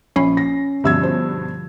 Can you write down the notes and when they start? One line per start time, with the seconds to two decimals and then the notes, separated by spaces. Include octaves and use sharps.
0.16 A#1 C#4 B5 C7
0.37 A#6
0.84 G2 B2 D3 F3 G3 E5 E6 G#6
1.03 C5